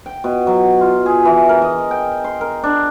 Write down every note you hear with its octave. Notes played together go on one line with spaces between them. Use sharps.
G5
B2
F#3
F4
G#4
E3
A#4
D#5
G5
C6
A#4
D4